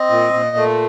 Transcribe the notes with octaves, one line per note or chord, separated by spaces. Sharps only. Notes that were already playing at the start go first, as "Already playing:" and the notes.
Already playing: C4 D#5
A#2
A#2
A3